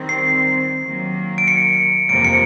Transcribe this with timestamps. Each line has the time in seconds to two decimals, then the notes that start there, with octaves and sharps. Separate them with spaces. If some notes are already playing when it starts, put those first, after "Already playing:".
Already playing: D#3 G3 C4
0.09 C7
0.86 D#3 F#3 A#3
1.38 D7
1.48 C#7
2.09 F2 C3 F3 A#3 D7
2.25 C#7